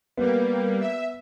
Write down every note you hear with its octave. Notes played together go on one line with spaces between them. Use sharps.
G3 A#3 B3
E5